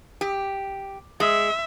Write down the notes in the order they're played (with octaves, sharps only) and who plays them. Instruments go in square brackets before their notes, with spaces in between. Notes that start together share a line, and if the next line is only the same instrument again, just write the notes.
[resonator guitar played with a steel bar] G4
[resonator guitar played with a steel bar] G#3 [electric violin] E5